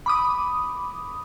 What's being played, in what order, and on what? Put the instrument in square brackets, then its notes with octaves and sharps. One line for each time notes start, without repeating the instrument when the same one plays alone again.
[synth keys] B5 D6 D#6